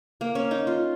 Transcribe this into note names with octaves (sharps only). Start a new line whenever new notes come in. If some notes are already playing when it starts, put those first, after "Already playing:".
A#3
C#4
D#4
F4